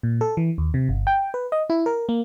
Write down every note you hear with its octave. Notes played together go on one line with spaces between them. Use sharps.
A#2
A4
E3
D#2
C3
G1
G5
B4
D#5
E4
A#4
A#3